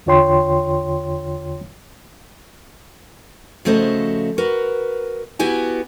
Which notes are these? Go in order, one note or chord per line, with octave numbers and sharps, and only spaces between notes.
E2 D3 F4 C#5 G5 C6
C#3 F3 A3 F#4 C5 D#5
F#4 A#4 B4
B3 E4 F#4 G4 G#5